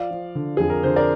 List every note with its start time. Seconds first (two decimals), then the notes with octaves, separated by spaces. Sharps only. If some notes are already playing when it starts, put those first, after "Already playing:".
Already playing: F3 D5 F5
0.11 F3
0.35 D3
0.57 F2 G#4
0.70 A#4
0.83 D3 C5
0.96 A#4 D5